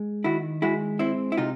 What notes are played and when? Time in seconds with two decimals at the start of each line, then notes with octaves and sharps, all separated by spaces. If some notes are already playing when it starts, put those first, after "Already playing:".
Already playing: G#3
0.24 D#3 E4 F#4
0.62 G#3 E4 F#4
0.99 C4 E4
1.32 E4
1.37 C3 D#4 F4